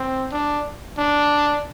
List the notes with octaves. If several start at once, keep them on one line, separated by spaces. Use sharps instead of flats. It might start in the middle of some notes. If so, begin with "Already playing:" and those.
Already playing: C4
D4
D4